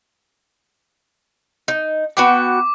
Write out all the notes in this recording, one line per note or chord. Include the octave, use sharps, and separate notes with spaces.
D#4
B3 F#4 G5 D6